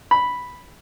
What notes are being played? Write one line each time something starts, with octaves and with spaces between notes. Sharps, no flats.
B5